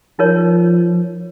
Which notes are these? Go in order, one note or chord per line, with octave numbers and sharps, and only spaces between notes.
F3 D#4 A#4 C#5